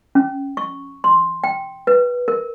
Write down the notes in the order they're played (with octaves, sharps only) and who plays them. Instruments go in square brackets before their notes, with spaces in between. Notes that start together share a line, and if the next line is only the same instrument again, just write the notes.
[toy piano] C#4
C#6
C6
G5
B4
A#4